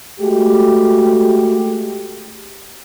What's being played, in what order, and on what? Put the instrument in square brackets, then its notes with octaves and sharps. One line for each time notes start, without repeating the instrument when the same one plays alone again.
[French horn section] G#3 A3 F#4 G4